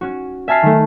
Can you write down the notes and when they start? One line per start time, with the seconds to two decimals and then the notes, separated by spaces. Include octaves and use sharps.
0.01 C#4 F#4
0.48 E5 G#5 A5 F6 C7
0.63 D#3 A3